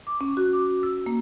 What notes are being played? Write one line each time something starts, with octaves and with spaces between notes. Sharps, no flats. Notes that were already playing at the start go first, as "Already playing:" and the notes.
D6
C#4
F#4
D6
E6
A#3